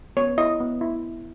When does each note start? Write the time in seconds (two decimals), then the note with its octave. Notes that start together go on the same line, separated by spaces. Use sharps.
0.17 B3 C#5
0.38 E4 D#5
0.60 B3
0.81 E4